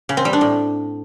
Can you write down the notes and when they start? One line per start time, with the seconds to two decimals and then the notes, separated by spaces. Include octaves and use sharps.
0.09 C#3
0.17 C4
0.25 G3
0.33 D4
0.41 A2